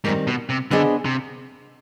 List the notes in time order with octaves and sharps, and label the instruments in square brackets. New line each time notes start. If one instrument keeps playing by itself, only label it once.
[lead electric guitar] G#2 [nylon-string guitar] D#3 G3 C4
[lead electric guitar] B2
C3
[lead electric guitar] D3 [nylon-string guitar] B3 D4 G#4 C5 D#5
[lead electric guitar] C3